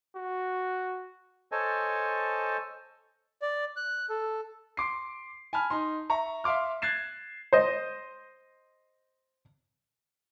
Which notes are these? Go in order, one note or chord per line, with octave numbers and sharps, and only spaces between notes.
F#4
A4 C5 C#5 D#5 G#5 A5
D5
F#6
A4
C6 D6 C7
G#5 A5 B5 F6
D#4 C6
E5 A#5 C#6
E5 F5 C6 D6 F6
F#6 G#6 A6 C7 E7
C5 D#5